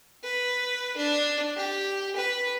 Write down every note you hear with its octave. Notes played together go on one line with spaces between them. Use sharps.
B4
D4
G4
B4